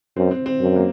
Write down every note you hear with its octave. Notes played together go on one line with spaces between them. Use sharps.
F#2 C4
C4
C4
F#2
A#3